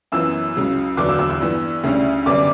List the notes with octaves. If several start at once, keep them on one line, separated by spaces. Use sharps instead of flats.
F#2 E3 B3 E6
C#2 C#3 F#3
E2 D3 F#3 B3 D6
E6
E6
E6
G2 E3 B3
D2 C#3 G3 C#4
F#2 D3 G3 B3 D6